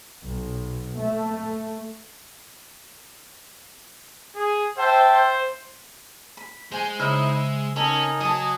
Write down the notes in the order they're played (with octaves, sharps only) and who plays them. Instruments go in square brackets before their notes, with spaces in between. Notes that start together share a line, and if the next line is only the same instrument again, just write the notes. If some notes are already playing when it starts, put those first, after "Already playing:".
[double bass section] B1
A3
[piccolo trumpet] G#4
[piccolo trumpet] C5 [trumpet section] E5 G5 A5
[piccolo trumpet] C5
[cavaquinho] B5
[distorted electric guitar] G#3 [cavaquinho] C5 G#5
[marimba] C#3 [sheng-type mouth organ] D#4 E4 [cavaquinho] C5 E5
[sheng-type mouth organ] E6
[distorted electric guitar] C#4 [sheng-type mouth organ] D#4 A#4 G#5 [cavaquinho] A4 C#5 B5
[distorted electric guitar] F#3 [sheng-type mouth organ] D#5 G#5 [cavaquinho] A5 D#6